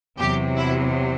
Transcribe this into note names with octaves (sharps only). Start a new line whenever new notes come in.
E2 C3 F#3 G4
E4